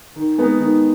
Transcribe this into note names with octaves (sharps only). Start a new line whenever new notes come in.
D#3
G#3 B3 D#4
D#3